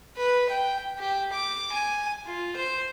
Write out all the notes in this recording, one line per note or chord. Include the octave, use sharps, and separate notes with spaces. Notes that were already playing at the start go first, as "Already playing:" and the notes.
B4
G5
G4
D6
G#5
F4
C5